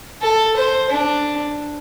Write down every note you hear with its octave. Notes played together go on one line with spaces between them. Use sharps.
A4
C5
D4